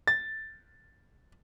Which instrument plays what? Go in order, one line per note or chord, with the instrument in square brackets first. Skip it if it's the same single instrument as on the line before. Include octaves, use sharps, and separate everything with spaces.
[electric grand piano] A6